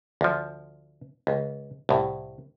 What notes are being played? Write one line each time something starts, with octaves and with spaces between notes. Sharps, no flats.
D2 F3
C#2
C2 A2